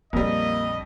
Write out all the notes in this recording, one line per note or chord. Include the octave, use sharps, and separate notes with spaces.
A#1 F2 G3 A#3 D4 D#5